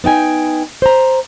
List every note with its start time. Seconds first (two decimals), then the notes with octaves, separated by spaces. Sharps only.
0.04 B3 D#4 G5 G#5
0.82 C5 A#5